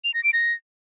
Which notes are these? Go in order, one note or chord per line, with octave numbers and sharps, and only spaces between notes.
F7
A#6
D7
A#6